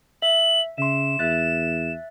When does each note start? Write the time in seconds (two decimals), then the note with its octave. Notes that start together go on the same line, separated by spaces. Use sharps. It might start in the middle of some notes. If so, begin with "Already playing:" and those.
0.22 E5 F#7
0.78 C#3 E5 C6 E7
1.19 E2 E5 F#6 A6